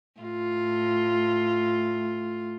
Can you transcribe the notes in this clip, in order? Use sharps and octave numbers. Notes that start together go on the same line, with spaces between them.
A2 F4